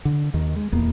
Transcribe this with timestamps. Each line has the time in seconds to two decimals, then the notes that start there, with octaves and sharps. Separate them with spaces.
0.05 D3
0.34 D#2 D#3
0.56 G#3
0.72 D#1 E2 A#3 B3